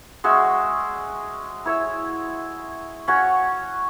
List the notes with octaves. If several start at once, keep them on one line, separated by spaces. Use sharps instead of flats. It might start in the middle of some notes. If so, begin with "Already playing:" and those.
G#3 C#4 F#4 E5
E4 C#5 E5
C#4 F#4 C#5